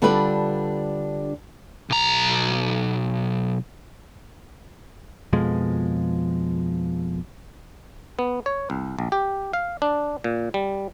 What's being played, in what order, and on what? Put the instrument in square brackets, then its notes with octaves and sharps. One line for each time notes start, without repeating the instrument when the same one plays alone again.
[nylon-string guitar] D3 G3 D4 F4 A4 B4
[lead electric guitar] B1 A#5
[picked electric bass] F2 B2 F3 G#3
[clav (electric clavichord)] B3
C#5
C2
A#1
G4
F5
D4
A#2
G3